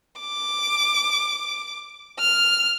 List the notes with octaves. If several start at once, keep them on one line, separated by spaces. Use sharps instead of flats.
D6
F6